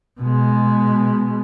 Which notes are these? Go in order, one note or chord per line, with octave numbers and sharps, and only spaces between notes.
B2 G#3